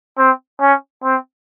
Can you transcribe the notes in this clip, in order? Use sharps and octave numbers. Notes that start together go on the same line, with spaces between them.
C4
C#4
C4